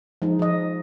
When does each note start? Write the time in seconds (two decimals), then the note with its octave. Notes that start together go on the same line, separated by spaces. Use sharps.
0.22 F3 G#3 D#4
0.39 F3 D#5